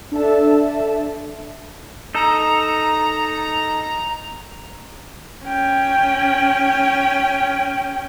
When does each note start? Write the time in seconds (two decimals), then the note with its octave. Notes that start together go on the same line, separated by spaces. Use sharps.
0.12 D4 A4 E5 A5
2.15 D#4 A4 A#5
5.44 C#4 G5